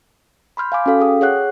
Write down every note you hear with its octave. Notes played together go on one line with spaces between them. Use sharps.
B5 C6 F6 G6
F5 G#5 D6
C#4 F#4 A4 F5
G#4 G5 D#6
G#4 C#5 F#5 F#6